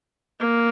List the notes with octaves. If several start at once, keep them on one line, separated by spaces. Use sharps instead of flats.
A#3